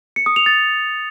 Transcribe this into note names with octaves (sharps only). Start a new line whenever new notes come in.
C#7
D#6
F7
A6